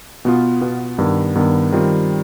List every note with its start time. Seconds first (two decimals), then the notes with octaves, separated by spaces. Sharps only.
0.25 B2 B3 F4
0.61 B2 B3 F4
0.98 G2 D#3 B3
1.35 G2 D#3 B3
1.72 D#3 G3 C4 F4